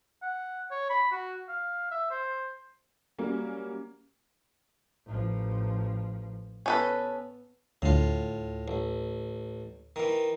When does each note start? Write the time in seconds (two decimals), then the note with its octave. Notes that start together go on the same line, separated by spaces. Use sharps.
0.22 F#5
0.71 C#5
0.90 B5
1.12 F#4
1.49 F5
1.91 E5
2.11 C5
3.19 F#3 G3 A#3 C#4
5.06 A1 F3
6.66 B3 C#4 A4 B4
7.82 D2 A2 F4
8.68 A1
9.96 D#3 E3